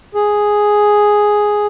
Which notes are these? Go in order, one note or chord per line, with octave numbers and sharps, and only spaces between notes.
G#4